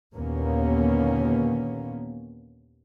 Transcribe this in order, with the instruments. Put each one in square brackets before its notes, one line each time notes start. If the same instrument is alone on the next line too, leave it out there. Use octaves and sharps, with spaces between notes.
[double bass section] D#2 A#2 D3 A#3 B3 C#4